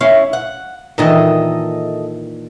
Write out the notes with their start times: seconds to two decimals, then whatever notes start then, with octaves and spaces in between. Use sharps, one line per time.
0.01 C#4 E4 F5
0.33 F#5
0.98 A#2 D#3 E3 A4 D#5 E5